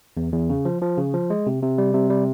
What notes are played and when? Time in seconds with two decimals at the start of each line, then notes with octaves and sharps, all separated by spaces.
0.17 E2
0.33 E2
0.50 C#3
0.65 F3
0.82 F3
0.97 C#3
1.14 F3
1.30 G#3
1.47 C3
1.63 C3
1.78 G3
1.94 C3
2.10 G3